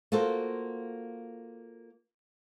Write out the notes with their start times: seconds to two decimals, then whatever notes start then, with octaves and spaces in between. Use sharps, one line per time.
0.12 A#3 F4 F#4 A4 C5